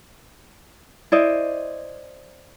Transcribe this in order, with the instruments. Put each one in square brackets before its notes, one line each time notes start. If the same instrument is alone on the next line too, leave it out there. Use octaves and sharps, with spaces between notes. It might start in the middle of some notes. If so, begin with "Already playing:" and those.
[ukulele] E4 C5 D5 D#5